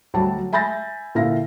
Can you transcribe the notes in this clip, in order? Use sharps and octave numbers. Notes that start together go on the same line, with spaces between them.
D2 F#3 G3 A5
E5 G#5 B5 G6 A6 A#6
A#2 D3 E4 E5 F5 A#6